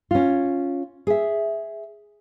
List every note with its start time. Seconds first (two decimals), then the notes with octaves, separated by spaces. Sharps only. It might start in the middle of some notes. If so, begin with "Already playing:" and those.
0.11 C#4 F4
1.07 G#4 E5